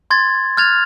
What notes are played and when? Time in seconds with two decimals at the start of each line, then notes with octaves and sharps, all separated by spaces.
0.10 C6 G#6 A6
0.57 F6 F#6 G#6 A6 F7